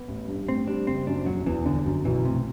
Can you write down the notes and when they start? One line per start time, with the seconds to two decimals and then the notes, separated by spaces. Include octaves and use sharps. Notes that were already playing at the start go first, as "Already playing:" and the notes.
Already playing: B3
0.08 A1
0.28 G2
0.48 A2 C4
0.67 G3 D4
0.87 F#1 C4
1.07 F#2 D4
1.26 E1 F#3
1.46 E2 E3
1.66 G1 D3
1.86 F#2
2.05 B1 E3
2.25 A2 C3